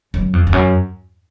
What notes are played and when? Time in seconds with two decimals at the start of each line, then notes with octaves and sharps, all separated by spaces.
0.14 F#2
0.33 F2
0.47 F2
0.53 F#2